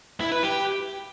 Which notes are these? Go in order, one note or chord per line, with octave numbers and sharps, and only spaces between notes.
E4
B4
G4